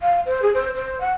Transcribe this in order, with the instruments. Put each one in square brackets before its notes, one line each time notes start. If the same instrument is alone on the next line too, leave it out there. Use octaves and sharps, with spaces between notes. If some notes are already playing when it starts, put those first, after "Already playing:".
[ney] F5
C5
G#4
C5
C5
F#5